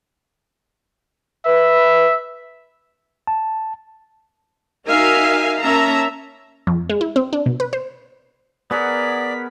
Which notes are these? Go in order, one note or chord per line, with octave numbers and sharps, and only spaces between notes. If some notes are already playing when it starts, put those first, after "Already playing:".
B4 E5
A5
D#4 F#4 A#4 E5 F5 G#5
A#3 C#4 E5 A5 A#5
F2
G#3
E4
C4
D4
B2
B4
C5
B3 G#4 A#4 C#5 D5 F#5 B6